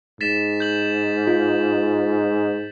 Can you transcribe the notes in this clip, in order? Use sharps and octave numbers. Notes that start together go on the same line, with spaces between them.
G#2 A6 B6 E7
G6 F#7
F4